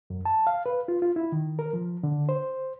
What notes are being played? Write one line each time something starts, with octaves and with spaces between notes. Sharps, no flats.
F#2
A5
F5
B4
F4
F4
E4
D#3
A#4
F3
D3
C5